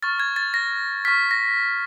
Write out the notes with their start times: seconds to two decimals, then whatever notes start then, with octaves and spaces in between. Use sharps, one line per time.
0.03 C#6 F6 A6
0.20 G#6
0.36 A6
0.54 A#6
1.05 C#6 F6 B6
1.31 A#6